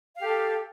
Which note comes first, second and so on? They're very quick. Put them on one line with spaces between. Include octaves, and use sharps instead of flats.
F5 G4 A4